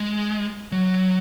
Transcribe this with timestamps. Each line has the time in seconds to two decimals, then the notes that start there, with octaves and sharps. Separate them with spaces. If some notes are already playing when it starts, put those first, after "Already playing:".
Already playing: G#3
0.72 F#3